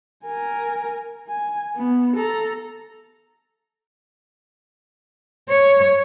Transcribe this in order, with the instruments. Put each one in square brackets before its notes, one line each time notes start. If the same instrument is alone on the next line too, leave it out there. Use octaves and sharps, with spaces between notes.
[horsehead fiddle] A#4 G#5
G#5
B3
A4 A#5
[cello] C#5